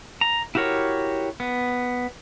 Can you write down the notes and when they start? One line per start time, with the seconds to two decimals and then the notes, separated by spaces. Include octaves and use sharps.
0.21 A#5
0.55 E4 F#4 G4 A#4 C#5
1.40 B3